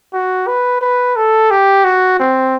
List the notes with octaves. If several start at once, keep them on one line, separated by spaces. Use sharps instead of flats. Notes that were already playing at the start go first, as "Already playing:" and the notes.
F#4
B4
B4
A4
G4
F#4
C4